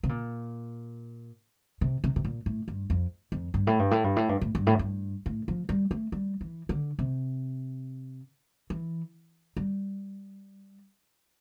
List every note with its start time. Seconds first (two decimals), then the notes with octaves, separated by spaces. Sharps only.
0.03 C3
0.09 A#2
1.81 C3
2.04 C3
2.16 C3
2.25 A#2
2.46 A2
2.68 G2
2.90 F2
3.32 F2
3.54 G2
3.67 A2
3.79 G2
3.91 A2
4.04 G2
4.16 A2
4.29 G2
4.41 A2
4.55 G2
4.67 A2
4.79 G2
5.26 A2
5.48 F3
5.69 G3
5.91 A3
6.12 G3
6.41 E3
6.69 D3
6.99 C3
8.70 E3
9.57 G3